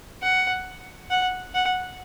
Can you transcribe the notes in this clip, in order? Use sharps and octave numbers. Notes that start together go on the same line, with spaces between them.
F#5
F#5
F#5